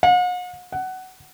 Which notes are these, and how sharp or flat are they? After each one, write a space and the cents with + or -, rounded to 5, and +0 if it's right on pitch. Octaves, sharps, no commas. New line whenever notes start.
F#5 -45
F#5 +15